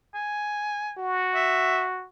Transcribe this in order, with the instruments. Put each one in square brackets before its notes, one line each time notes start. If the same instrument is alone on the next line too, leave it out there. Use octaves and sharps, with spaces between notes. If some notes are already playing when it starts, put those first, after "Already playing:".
[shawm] G#5
[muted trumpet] F#4
[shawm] E5